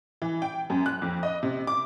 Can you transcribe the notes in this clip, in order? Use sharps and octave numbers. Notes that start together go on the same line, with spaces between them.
E3
G5
F#2
F#6
F2
D#5
C3
D6